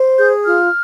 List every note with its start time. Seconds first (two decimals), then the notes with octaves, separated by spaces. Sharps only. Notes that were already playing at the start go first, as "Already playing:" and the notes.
Already playing: C5
0.18 G#4 G6
0.45 F4 F6